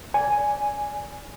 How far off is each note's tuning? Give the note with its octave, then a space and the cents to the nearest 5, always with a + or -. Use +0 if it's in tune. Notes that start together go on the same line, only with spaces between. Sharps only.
D5 -20 G#5 +0